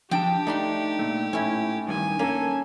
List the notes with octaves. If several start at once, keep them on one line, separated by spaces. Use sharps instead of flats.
F3 D4 G4 G5 A5
A3 D4 D#4 B5 C6
A#2 A3
A2 C#4 E4
G2 D#3 G#5
A#3 C#4 A4